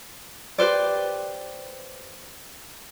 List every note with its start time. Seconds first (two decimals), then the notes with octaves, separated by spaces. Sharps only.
0.58 G4 B4 C5 D5